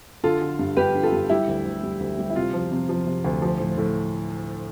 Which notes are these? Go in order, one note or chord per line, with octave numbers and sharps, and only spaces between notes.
D3 F4 A4
D3
G2
G2 G4 B4
D3
F4 A4
G2
G3 E4 G4
D2
D2
G3
D2
G3
E4
C3 F4
F3
C3
F3
C3
D2
F3
A2
A2